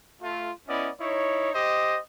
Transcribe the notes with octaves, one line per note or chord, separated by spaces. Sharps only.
A3 F4
B3 C#4 E4 D5 D#5
D#4 E4 C#5
G4 C5 D#5